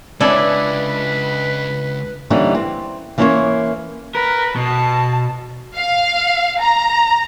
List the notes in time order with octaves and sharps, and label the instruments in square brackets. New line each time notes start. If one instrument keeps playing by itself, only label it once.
[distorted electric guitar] C#2 G#3 [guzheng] D4 [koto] E4 A4 G#5 [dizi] B4
[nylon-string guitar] D3 E3 G3 A#3 C#4 D#4
C4
E3 A#3 C#4 E4 C5 C#5
[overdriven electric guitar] A#4 [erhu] B4
[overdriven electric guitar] B2 [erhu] A5
[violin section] F5
A#5